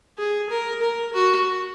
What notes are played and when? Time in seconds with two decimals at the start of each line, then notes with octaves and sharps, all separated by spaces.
0.18 G#4
0.50 A#4
0.81 A#4
1.13 F#4